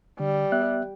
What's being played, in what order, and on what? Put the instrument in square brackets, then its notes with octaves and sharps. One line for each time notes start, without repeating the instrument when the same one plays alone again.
[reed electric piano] D3 [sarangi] G3
[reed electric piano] B3 E5 F#6